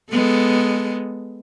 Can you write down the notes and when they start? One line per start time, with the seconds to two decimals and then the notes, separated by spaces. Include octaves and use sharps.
0.11 G#3 B3 A4